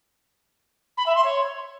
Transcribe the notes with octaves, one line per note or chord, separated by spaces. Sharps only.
B5
E5
C6
C#5